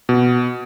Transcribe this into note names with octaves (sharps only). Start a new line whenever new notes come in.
B2